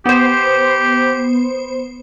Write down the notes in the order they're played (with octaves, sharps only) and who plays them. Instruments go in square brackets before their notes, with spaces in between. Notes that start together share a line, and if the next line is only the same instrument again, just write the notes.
[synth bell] B3 C5 [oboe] G4